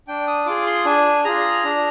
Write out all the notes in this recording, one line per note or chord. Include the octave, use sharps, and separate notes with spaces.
D4 G5
D#6
F4 G#4 D6
C6
D4 G#5
F4 G#4 A#5
D4